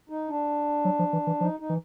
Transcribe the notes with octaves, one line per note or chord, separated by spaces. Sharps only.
D#4
D4
F#3
F3
E3
E3
F3 D#4
D#4
E3